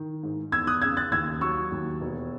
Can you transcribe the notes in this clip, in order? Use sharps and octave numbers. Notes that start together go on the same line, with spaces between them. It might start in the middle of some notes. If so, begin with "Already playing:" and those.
Already playing: D#3
G#2
E2 E6 G#6
D#6 F#6
C#3 E6 G#6
F#6 A6
D#2 E6 G#6
F#3 C#6 E6
D#2
E1